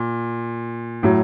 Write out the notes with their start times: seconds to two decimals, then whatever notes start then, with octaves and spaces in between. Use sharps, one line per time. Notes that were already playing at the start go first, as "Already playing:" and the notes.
Already playing: A#2
1.03 A2 F#3